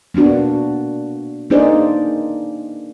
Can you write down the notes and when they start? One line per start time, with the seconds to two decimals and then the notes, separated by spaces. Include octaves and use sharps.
0.14 A#3 B3 D4 F#4
1.50 A#3 D4 D#4 G#4 C5 D5